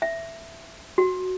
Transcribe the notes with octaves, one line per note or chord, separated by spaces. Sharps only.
E5
F#4